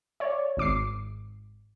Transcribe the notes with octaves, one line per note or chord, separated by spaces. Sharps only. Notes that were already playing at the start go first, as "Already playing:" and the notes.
C#5 D5
G#1 D6 C7